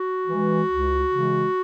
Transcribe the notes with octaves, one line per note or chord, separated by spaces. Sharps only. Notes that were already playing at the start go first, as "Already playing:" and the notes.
Already playing: F#4
E3 G#3
C#2
C#3 E3 G#3